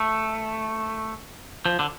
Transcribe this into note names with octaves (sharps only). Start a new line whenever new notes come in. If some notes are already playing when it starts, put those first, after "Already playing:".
Already playing: A3
F3
D3